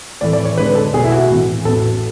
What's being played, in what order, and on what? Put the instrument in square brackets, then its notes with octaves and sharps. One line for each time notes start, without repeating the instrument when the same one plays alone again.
[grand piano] A2 E3 A3 [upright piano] D5
[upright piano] D5
C#5
[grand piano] D3 G#3 D4 [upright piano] B4
[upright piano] A4
[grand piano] B1 B2 A3 [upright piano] G#4
[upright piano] E4
F#4
[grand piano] A2 E3 B3
[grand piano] A1 A2 F#3 B3 [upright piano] A4